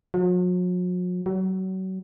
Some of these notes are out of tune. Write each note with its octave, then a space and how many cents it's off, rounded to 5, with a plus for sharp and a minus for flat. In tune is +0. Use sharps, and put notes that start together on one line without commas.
F#3 -45
F#3 +30